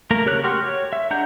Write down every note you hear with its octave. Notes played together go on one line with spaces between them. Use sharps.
A3 A#3 A#4 A#5
C#3 G4 A#4 C#5 F#6
F#4 G4 F#5 C6 F6
C#5
E5
G#3 D4 F#5 A#5 G6